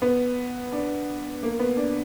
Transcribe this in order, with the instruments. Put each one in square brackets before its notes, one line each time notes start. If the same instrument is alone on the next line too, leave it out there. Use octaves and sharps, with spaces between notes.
[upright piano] B3
D4
A#3
B3
D4